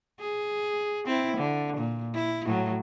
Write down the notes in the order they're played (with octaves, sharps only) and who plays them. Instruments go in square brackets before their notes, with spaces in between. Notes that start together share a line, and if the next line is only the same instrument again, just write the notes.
[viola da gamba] G#4
C4 E4
D3
A#2
E4
A2 F#3